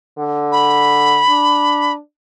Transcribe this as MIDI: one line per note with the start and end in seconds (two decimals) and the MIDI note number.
0.19 1.22 50
0.52 1.93 83
1.29 1.99 62